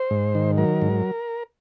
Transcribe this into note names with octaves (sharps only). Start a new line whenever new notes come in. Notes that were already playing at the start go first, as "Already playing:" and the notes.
Already playing: C5
G#2
D#3
F#3 A#4
G#2